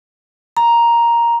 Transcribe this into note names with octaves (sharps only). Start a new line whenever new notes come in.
A#5